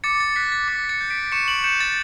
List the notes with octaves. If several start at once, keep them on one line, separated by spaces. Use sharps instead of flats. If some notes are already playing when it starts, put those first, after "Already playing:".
D6 A6 C#7
A6
F#6 B6
A6
D6 B6
A6 C#7
G6
B6 D7
C#6 C#7 E7
D7 F#7
G6 C#7 E7
A6